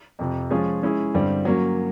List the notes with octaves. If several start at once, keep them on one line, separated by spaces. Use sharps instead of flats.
F2 C3 F3
F3 G#3 C#4 F4 G#4
G#3 C#4 E4 G#4
G2 D3 G3 C4
F#3 A#3 C#4